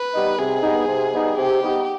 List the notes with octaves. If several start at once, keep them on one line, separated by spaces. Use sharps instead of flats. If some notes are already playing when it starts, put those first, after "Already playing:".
Already playing: B4
G3 B3 D#4
C3 G#4
G3 B3 D#4
C3
G3 B3 D#4
C3 G4
G3 B3 D#4